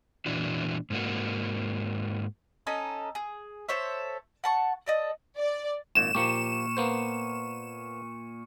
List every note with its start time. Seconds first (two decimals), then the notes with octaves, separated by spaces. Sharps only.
0.26 A#2 E3 D4 F#4
0.90 G#2 A#3 F#4
2.67 C#4 D#4 A4
3.15 G#4
3.69 A4 C5 C#5 E5
4.44 F#5 A5 C#6
4.86 A4 D5 D#5
5.38 D5
5.95 G#1 A#2 E7
6.15 A#2 F3 A#3 G4 C#6 C#7
6.77 A#3 B3 C5